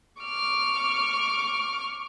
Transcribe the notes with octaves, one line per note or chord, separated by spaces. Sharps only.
C#6 D6 F6